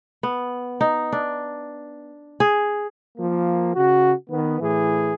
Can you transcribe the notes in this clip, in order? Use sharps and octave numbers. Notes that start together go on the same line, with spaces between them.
B3
D#4
D4
G#4
F3 A#3
C#3 F#4
D#3 B3
A2 E3 G#4